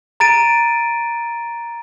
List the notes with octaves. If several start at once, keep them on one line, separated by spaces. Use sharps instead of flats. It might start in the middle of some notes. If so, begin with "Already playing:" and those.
A#5 A6 D7 D#7